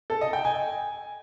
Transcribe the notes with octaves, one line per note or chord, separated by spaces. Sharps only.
A4
D#5
G5
G#5